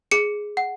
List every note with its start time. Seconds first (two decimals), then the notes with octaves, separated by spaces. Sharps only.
0.11 G#4 C#7
0.57 F#5